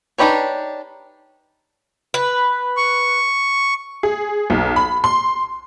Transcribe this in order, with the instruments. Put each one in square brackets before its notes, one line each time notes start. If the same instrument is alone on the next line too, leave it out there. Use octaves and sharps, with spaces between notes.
[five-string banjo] D4 D#4 G4 B4 C#5
[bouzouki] B4
[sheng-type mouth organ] C#6
[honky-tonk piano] G#4
B1
B5
C6